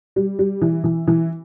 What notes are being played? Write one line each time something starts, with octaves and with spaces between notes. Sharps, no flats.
G3
G3
E3
E3
E3